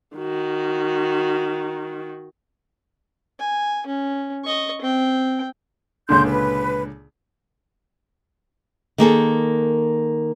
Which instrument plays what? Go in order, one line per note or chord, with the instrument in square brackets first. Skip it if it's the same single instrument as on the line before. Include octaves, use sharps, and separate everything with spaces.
[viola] D#3 F#4
[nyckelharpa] G#5
C#4
D#5 C#6
C4 G5
[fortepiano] C#2 A#2 D3 [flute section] C6 G6
[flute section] B4
[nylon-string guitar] D#3 A#3 G#4 A4